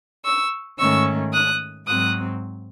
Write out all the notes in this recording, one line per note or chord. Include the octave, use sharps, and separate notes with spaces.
C#6 E6
G#2 D#3 A3 C#4 C#6 E6
D#6 F#6
G#2 F#3 C4 D#6 F#6